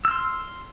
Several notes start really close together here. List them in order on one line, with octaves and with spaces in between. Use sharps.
E6 F6 C6